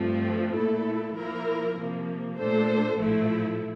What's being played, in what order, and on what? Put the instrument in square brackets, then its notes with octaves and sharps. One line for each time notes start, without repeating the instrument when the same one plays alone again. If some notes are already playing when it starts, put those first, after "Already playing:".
Already playing: [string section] G2 F3 A3 C4
A#2 A3 E4 A4
F3 A#3 E4 A#4
C3 F3 A#3
A#2 A3 D4 A4 C5
A#1 A2 F3 A3 E4